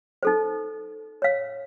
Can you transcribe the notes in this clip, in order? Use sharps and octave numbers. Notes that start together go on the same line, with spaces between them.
D#4 A4 C5
C#5 F5